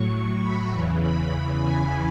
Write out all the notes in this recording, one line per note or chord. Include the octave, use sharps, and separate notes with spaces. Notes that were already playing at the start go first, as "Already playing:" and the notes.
Already playing: A2 F#3 C#6
B5
E2 C#3 E3
B5
G#5